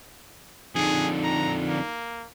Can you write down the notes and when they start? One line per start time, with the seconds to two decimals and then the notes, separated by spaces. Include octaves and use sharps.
0.75 F2 D3 D#4 G#4
1.24 A#5
1.68 A#3